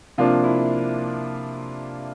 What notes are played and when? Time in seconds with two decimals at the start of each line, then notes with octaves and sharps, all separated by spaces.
0.18 C3 F3 A#3 D4 F4
0.44 E4